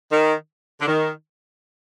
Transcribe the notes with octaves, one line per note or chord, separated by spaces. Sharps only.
D#3
D3
D#3